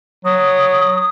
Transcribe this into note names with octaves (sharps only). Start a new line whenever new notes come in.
F#3 D#6